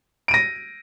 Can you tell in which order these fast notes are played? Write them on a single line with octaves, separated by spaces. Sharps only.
D7 D#7 A#6